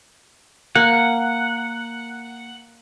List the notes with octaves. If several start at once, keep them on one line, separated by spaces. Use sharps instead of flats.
A#3 F#5